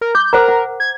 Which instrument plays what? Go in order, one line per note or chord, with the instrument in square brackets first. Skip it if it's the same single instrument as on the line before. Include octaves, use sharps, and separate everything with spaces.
[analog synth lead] A#4
[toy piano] D6 [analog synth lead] G6
[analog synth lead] A#4 [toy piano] C5 F#5 A#5
[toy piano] F#5
[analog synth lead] G#6